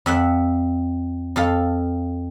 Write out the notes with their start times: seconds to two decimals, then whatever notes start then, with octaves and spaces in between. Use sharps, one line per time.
0.06 F2 E5 F#5
1.36 F2 A4 F5